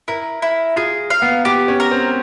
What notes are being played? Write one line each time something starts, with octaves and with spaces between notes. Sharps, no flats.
E4 A#4
E4
F4 G#4
F5
B3
B3 G4
C#4
A#4
C4